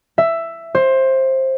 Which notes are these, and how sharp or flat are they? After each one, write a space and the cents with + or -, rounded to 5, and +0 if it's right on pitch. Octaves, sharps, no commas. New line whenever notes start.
E5 +10
C5 +15